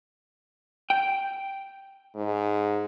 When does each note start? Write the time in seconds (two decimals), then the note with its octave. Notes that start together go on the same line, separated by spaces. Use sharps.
0.90 G5
2.15 G#2